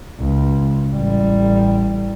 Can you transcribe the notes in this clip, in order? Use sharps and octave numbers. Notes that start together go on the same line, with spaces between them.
C#2
A1 G3